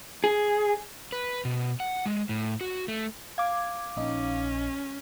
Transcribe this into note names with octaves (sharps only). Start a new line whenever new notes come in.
G#4
B4
B2
F#5
G#3
A2
F#4
A3
F5 D6 G#6
A#1 C#4 D#4